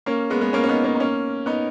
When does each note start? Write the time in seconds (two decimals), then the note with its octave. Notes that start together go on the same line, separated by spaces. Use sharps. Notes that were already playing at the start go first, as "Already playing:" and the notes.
0.06 A#3 C#4
0.30 G#3 B3
0.41 G#3 B3
0.53 A#3 C#4
0.64 C#4
0.69 B3 D#4
0.84 A#3 C#4
0.95 D#4
1.00 A#3 C#4
1.46 B3 D#4